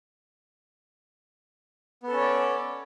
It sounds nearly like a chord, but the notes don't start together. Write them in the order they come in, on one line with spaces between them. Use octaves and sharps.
B3 A4 C#4 C#5 D5